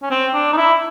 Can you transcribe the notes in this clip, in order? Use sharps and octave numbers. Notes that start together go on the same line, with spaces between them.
C#4
C4
D4
D#4
E4